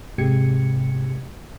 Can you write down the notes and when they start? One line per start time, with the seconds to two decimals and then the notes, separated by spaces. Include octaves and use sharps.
0.18 G#2 C3 G#3 G4 G#6 C#7